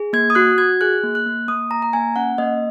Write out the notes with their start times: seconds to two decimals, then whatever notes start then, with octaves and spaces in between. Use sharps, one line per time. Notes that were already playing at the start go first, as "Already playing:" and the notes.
Already playing: G#4
0.13 A#3 G#6
0.30 D#6
0.35 F#4 F#6
0.58 F#4 G#6
0.81 G#4 F#6
1.04 A#3
1.15 F#6
1.26 A#3
1.48 A#3 D#6
1.71 A#3 A#5
1.82 A#5
1.93 A#3 G#5
2.16 C#4 F#5
2.38 A#3 D#5